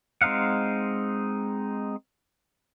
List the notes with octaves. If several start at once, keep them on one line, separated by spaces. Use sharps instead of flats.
G#3 C4 D#4 F5 F#5